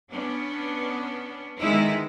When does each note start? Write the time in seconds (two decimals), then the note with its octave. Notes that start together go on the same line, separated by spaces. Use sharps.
0.11 B3 C#4 D4
1.60 D3 D#3 G#3 B3 D#4 E4